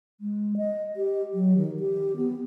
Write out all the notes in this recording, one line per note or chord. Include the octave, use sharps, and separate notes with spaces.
G#3
D#5
G4
F#3
D#3
G4
B3